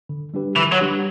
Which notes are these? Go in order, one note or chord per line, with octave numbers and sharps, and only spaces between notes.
D3
G3 D4 G4 B4
D3 E3
F#3
G3 D4 G4 B4